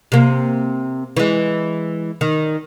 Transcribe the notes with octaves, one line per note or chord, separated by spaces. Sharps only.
C3 A#3
E3 G#3
D#3